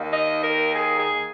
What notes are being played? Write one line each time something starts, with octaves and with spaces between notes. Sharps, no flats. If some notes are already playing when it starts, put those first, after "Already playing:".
Already playing: D#2 D#3 A#3 D#4
D#5
A#4
G#4
G#4